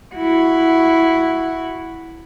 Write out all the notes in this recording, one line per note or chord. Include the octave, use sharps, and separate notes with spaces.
E4 F#4